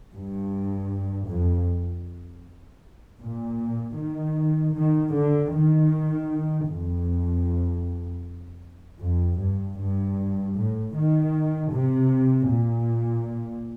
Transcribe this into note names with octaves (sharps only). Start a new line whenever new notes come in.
G2
F2
A#2
D#3
D#3
D3
D#3
F2
F2
G2
G2
A2
D#3
C3
A#2